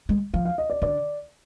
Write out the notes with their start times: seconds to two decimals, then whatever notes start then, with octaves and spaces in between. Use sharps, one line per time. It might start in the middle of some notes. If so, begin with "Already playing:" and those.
0.09 G#3
0.34 F3 F5
0.45 F5
0.58 D#5
0.70 D5
0.82 D3 D5